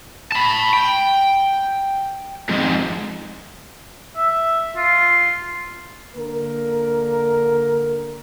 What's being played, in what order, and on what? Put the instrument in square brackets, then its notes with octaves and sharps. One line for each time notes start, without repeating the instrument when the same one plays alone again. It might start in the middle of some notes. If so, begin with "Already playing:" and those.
[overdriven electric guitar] A5 B5
G5
F2 G#2
[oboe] E5
F4
[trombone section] D3 A#3 A#4